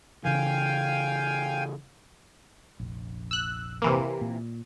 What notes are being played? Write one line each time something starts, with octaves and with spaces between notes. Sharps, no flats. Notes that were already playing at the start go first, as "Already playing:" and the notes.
C#3 E3 F5 G5 G#5
F1 A#1
E6 F#6
C3 E3 A#3
A#2